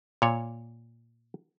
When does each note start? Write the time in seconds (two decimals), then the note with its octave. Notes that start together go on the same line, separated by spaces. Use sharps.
0.22 A#2 C#5